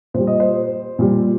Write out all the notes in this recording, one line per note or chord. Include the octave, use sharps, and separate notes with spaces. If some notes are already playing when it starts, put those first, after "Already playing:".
A#2 G3 C5
D#5
C5
A#2 G3